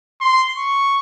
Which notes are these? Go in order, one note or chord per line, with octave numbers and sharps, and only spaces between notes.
C6
C#6